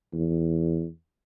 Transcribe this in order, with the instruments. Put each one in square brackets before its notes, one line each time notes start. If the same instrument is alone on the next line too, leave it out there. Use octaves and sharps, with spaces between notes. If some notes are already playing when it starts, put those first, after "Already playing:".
[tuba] E2